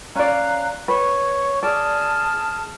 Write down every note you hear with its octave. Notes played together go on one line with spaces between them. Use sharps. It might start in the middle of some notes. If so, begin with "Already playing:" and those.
C#4 D5 F5 A#5 F#6
B4 C#5 C#6
G#4 D5 A5 F6